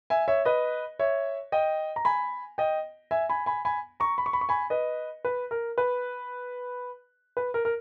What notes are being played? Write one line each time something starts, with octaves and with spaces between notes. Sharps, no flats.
E5 G#5
C#5 E5
B4 D#5
C#5 E5
D#5 G5
A#5
G#5 B5
D#5 G5
E5 G#5
G#5 B5
G#5 B5
G#5 B5
A#5 C#6
B5
C#6
B5
C#6
G#5 B5
B4 D#5
B4
A#4
B4
B4
A#4
A#4